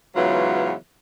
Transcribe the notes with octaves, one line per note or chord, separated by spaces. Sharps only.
G#2 C#3 E3 F#3 B3 F4